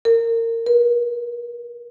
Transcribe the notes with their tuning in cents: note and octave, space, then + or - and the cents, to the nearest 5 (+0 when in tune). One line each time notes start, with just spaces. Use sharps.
A#4 -25
A#4 +45